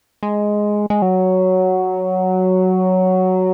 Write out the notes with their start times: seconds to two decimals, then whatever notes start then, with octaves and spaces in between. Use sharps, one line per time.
0.23 G#3
0.90 G#3
1.02 F#3